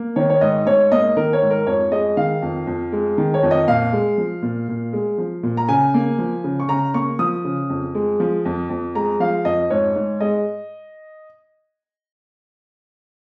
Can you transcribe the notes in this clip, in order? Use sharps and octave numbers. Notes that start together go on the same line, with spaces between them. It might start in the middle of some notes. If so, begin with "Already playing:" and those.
Already playing: A#3
D#3 C#5
C#5
G#2 D#5
G#2 C#5
A#3 D#5
D#3 A#4
C#5
G#2
A#4
F2 C#5
G#3 D#5
D#3 F5
F2
F2
G#3
D#3
C#5
F2
D#5
A#2 F5
G#3
F3
A#2
A#2
G#3
F3
A#2
A#5
C#3 G#5
A#3
F3
C#3
C#6
C#3 A#5
A#3 C#6
F3 D#6
C#3
F2
G#3
F3
F2
F2
G#3 A#5
F3 F5
F2 D#5
G#2 C#5
G#2
G#3 D#5